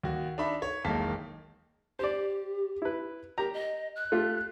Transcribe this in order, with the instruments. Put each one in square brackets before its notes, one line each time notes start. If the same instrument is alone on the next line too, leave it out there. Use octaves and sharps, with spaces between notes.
[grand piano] D#2 F#4
D4 D#4 E5 B5
C#5
E1 B1 D#3 A#3 A5 B6
[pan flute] G4 [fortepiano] C5 D5
[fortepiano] E4 B4
[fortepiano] G4 A#5 [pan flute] A#4
[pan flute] D#5
F#6
[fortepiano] A3 F4 G4